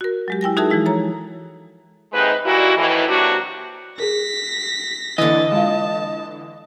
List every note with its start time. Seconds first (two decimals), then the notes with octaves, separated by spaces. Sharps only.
0.01 F#4 A#4
0.28 F#3 G#3 G4
0.41 E4 G5 G#5 A#6
0.57 D#4 F#4 G#4 A#4 E5 A5
0.70 E3 F3 G#3 E4
0.86 A4 C#5 A#5
2.13 D#2 G#2 C3 G#3 D#4 B4
2.45 A#2 G3 D#4 E4 F#4
2.77 F2 A2 D#3 E3
3.08 C3 F#3 A#3 D4 F#4
4.00 G#4 A#4 A#6 B6
5.18 D3 E3 A#3 E4 D#5 A6
5.52 G#3 F4 F5 A5